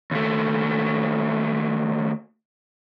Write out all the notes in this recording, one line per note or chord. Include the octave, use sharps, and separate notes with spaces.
D#2 A3